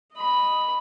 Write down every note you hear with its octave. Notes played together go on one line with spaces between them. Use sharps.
D#5 B5